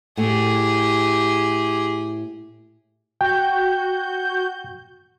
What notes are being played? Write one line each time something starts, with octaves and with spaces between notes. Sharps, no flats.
A2 A3 G4 G#4
F#4 G5 G6